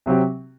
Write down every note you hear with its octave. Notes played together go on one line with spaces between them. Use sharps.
C3 F#3 C4 G4